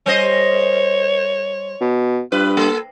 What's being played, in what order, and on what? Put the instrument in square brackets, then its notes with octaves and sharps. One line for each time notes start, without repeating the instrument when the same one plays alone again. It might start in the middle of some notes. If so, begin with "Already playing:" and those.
[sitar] G3 C5 D#5 [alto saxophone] C#5
[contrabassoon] B2
[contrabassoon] G2 [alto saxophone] F4 [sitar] B4
[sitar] A#3 [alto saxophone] A4